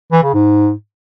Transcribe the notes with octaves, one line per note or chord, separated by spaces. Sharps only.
E3
C#3
G#2